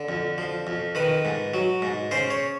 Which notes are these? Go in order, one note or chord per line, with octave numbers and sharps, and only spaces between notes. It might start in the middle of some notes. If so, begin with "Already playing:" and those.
Already playing: D3
F2
F3
F2
D#3 B4
G#2
F#3
G#2
C#3 C5
C#5